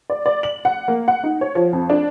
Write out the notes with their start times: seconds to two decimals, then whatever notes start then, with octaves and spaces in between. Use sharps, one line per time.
0.10 D5
0.26 D5
0.43 F#7
0.65 F#5
0.88 A#3
1.08 F#5
1.24 D#4
1.41 C#5
1.55 F3
1.73 F2
1.90 D4